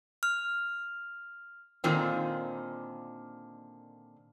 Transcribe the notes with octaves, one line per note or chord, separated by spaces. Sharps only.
F6
A#2 D3 D#3 C4 F4